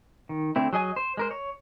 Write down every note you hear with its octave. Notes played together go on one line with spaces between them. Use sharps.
D#3
D3 A3 C4 E4
F#3 G#4 D#5 G#5
C5
G#3 A#4 C5
C#5